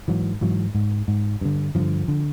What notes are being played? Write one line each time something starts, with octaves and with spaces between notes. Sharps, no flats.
G#2 E3 F#3
G#2 E3 F#3
G#2
G#2
G2 D3
G2 D3 D#3 F3
D3